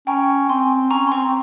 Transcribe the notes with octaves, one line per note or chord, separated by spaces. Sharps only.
C#4 G5 A#5
C4 G#5 C6
C#4 A#5 C#6
C6
C4 A#5 C#6
C4